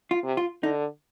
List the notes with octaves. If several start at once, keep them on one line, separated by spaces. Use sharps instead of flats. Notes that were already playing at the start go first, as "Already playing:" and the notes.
F4
C3
F4
D3 D#4